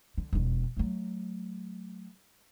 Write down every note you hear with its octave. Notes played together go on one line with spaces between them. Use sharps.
D3
E1 F2
F#3 A3